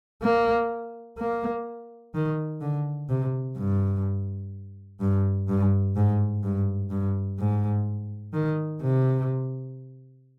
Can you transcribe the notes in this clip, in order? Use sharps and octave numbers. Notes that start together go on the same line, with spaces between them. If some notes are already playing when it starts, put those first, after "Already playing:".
A#3
A#3
D#3
D3
C3
G2
G2
G2
G#2
G2
G2
G#2
D#3
C3